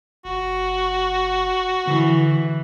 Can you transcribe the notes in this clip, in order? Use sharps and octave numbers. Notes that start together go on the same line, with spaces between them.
F#1 F#4
D3 E3